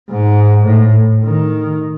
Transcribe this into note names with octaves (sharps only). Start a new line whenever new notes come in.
G#2
A2
D#3